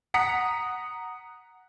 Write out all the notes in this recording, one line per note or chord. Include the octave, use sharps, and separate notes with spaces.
F#5 A#5 D#6 B6 C#7